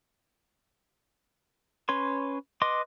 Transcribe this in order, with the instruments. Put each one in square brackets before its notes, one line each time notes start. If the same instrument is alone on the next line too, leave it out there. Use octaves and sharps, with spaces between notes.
[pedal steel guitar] C#4 B4 C#5 C6
B4 D#5 C6 D6